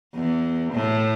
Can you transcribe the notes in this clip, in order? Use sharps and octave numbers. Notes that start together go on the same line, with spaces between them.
E2
A2